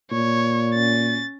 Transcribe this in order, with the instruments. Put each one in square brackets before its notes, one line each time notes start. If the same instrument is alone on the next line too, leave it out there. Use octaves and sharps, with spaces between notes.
[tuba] A#2 [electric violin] C#5
[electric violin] C#4 A6